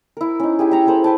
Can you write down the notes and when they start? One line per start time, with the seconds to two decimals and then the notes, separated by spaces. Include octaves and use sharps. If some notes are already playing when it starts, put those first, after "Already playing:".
0.17 E4 A#4
0.40 C#4 D#4
0.59 E4 G4 G#4
0.71 E5 A#5 C#6
0.86 G#4 A4 C5 B5
1.04 B4 G5 A5